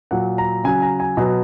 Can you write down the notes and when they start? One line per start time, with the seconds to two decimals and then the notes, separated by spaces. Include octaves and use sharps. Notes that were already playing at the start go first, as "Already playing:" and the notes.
0.11 A#2 F#3 F#5
0.38 A#5
0.64 C#3 F#3 G#5
0.82 A#5
1.00 G#5
1.17 B2 F#3